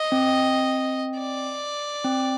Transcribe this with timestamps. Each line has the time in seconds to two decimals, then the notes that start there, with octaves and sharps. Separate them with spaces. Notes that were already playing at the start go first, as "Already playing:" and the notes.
Already playing: D#5
0.12 C4
1.18 D5
2.04 C4